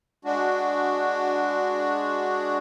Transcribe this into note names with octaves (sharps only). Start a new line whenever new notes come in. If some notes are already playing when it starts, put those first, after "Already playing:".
G#3 D4 F#4